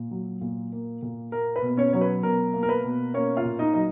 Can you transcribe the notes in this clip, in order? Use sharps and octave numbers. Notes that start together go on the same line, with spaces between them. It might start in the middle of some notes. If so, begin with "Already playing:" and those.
Already playing: A#2
F#3
A#2
A#3
A#2
A#3 A#4
B4
B2
C#4 C#5
F#3 C#5
B4
B2 A#4
A#3
A#4
B4
B2
A#3 C#4 C#5
F4 F5
A#2
D#4 D#5
F#3 D#5